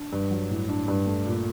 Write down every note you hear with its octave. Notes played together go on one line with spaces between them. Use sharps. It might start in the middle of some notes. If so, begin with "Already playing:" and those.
Already playing: D4
G2
F#3
A2
D4
G2
A3
A#2